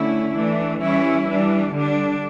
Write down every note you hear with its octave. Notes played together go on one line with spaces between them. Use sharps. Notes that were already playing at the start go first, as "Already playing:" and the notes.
Already playing: D3 A3 C#4 E4
E3 A3 D4
E3 G3 C#4 E4
E3 G3 D4
D3 G3 D4